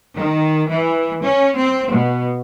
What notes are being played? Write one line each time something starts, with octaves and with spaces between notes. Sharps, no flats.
D#3
E3
C#4
C4
B2